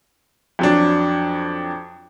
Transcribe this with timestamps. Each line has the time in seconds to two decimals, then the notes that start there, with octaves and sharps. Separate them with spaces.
0.59 F2 F#3 D4